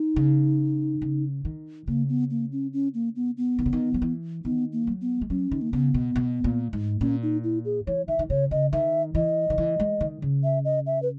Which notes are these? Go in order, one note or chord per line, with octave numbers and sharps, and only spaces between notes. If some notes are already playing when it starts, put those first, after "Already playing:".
Already playing: D#4
C#3
C#3
D#3
C#3 A#3
B3
A#3
C#4
C#4
A#3
B3
B3
D#3
C#3
D#3
F#3
E3
D#3 B3
A#3
F#3
B3
G#3
F#3 C#4
D#3
A#3
C#3 B3
B2
B2
A#2
G#2
A#2 C#4
D#4
E4
G#4
E3 C#5
D#3 E5
D#3
C#3 C#5
C#3 D#5
D#3 E5
E3 D#5
D#3
E3
G#3
D#3
C#3
E5
D#5
E5
B4